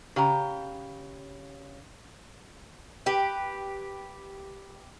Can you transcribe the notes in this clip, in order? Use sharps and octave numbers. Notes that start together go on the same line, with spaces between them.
C#3 G4 A#5
G4 B4